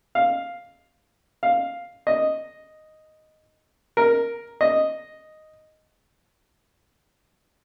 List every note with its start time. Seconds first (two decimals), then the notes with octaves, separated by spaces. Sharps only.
0.15 F5
1.43 F5
2.07 D#5
3.97 A#4
4.61 D#5